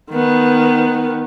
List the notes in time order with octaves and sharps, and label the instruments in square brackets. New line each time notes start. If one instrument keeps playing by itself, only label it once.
[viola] D#3 B3